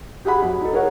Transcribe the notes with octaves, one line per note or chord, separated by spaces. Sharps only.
G4 G#4 F#5 B5
F#2
D#4 A4
G#4 A#4 C#5 F#5